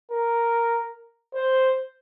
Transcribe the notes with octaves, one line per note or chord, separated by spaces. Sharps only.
A#4
C5